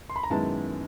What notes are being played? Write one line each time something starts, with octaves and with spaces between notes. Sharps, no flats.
C6
B5
A#5
F#2 D#3 G#3 B3 E4 A5